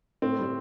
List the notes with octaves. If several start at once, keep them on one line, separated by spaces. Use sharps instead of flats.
A2 C4
G3